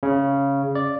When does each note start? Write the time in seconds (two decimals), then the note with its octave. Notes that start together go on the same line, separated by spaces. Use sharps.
0.03 C#3
0.75 D5